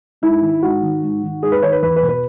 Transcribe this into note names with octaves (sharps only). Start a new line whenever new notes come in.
G#2 E4
D#3
G#2 F#4
D#3
G#2
D#3
G#2 G#4
B4
D#3 C#5
B4
E2 B4
B4
B2
B4